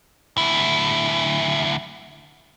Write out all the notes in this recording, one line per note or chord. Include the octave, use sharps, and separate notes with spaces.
D2 E4